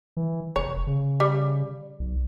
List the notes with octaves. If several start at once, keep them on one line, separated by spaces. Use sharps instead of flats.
E3
F1 C#5
C#3
G3
B1